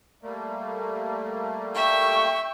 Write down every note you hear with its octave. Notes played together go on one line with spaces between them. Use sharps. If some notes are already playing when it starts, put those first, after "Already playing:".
G3 A3 A#3
E5 G5 C#6